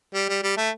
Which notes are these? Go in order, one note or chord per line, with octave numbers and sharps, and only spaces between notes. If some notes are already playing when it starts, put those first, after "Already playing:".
G3
G3
G3
A3